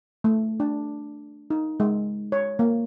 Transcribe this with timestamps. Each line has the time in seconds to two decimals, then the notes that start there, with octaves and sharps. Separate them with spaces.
0.24 A3
0.60 D4
1.50 D#4
1.80 G#3
2.32 C#5
2.59 A#3